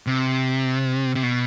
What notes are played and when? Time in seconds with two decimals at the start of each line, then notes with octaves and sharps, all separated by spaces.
0.07 C3
1.15 C3
1.23 B2